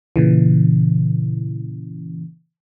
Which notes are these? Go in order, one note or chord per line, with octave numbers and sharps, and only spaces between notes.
A#2 C#3 E3